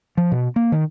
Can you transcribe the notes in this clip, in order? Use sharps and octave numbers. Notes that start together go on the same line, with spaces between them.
F3
B2
A#3
D#3